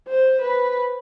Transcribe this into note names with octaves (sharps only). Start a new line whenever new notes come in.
C5
B4